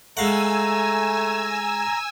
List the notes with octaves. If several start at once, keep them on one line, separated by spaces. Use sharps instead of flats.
G#3 A3 F5 F#5 G#5 A#5 E6